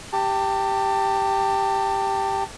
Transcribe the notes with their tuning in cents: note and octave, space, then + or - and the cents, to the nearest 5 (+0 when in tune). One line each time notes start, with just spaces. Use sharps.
G4 +0 A5 +30